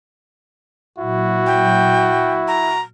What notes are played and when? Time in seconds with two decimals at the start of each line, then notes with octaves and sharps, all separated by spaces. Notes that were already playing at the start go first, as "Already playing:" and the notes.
0.98 A#2 F#3 E4 F#4
1.46 G5
2.48 A#5